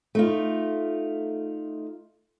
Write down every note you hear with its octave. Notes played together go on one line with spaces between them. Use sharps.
A3 D#4 F4